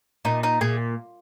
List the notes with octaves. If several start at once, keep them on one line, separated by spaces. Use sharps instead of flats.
A#2 D#4
D#4
A#2 G#4